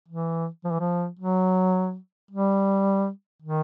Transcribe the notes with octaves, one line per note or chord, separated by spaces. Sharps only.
E3
F3
E3
F3
F#3
G3
D#3